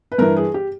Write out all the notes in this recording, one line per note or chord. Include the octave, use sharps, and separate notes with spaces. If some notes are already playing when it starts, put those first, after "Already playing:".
B4
G2 E3 A#4
G#4
G4